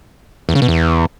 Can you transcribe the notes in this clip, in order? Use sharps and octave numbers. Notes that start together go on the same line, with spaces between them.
E2
C#3
B2
E2